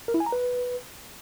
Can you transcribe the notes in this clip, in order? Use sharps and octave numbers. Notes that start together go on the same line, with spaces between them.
A#4
E4
G#5
A#5
B4